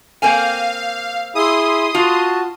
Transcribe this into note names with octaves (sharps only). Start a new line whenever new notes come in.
A#3 C4 F5 G#5
E4 G#4 E5 C6 D#6
F4 F#4 A5